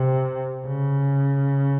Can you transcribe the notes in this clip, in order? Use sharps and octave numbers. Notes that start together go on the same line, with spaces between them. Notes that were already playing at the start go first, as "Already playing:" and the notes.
Already playing: C3
C#3